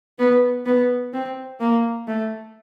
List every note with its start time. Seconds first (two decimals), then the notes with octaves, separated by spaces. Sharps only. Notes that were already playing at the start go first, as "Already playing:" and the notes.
0.19 B3
0.66 B3
1.13 C4
1.60 A#3
2.08 A3